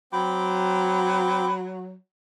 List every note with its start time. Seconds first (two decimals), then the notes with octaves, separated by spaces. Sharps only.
0.13 F#3 C4 G5 B5 D6